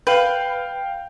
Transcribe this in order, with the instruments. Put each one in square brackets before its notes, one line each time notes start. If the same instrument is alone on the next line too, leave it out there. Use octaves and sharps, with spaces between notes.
[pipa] B4 [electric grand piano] F5 G5 G6